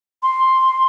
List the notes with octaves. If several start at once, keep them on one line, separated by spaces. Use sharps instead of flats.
C6